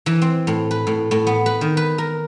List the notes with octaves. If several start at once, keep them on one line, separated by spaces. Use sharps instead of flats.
E3
C4
A2
B4
A2
A2
B3
B4
D#3
B4
A#4